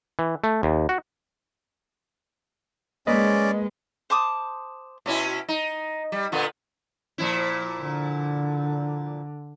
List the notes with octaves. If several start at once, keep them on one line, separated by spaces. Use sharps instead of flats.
E3
A3
D#2
F#4
G#3 A#3 C#4 B4 D5 D#5
C5 A5 D6 D#6
B2 C#4 E4
D#4
G3
A#2 D3 B3
A#2 F3 E4
D3